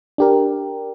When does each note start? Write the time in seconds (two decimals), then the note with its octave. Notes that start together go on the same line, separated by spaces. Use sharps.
0.18 D4 G4 A#4